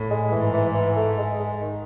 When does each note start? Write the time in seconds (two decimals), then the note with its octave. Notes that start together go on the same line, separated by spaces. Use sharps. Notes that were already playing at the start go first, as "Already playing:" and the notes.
Already playing: A2
0.10 G#3
0.32 G#2 E3
0.53 E3
0.74 E3
0.96 A3
1.18 G#3
1.40 G#3
1.61 D#3